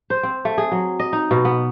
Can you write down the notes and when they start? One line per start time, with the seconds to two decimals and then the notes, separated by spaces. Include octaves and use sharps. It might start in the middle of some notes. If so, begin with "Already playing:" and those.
0.10 C5
0.23 C4
0.45 A3
0.58 G#4
0.72 F#3
1.00 D#5
1.13 D#4
1.31 B2
1.45 B3